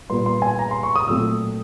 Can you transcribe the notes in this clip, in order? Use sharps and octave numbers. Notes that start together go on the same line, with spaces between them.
A#2 G3 B3 C6
C6
G#5
A#5
C6
C#6
D#6
A#2 F#3 A3 C4 E6